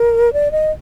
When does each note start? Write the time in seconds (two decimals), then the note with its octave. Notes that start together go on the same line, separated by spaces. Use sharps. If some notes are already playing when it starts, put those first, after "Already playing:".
Already playing: A#4
0.33 D5
0.52 D#5